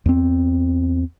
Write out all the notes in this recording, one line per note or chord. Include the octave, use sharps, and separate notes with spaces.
E2 B3 C4